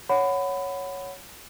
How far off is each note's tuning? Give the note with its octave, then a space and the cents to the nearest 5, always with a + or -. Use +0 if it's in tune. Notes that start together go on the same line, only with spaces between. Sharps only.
C#5 +5 F#5 +0 B5 +25